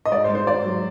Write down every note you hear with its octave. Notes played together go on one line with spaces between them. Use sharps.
D#5
G#2 D5
C5
G#2
C5
G#2 D5
F#3